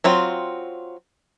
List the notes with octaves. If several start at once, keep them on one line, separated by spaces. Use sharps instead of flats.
F#3 C4 F4